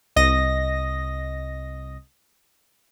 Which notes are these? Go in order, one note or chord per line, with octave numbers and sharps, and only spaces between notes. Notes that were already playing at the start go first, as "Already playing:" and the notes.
C2 D#5 A#6